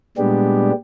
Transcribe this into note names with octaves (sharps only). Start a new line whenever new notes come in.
A#2 G3 G#3 B3 D4 G4